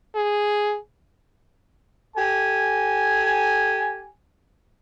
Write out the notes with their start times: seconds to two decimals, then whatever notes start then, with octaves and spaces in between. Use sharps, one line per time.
0.16 G#4
2.16 G4 A4 G#5